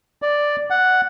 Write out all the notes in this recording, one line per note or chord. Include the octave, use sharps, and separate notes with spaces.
D5
F#5